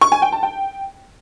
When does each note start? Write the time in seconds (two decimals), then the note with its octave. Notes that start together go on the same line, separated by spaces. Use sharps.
0.01 C#6
0.12 G#5
0.22 G5
0.32 A5
0.43 G5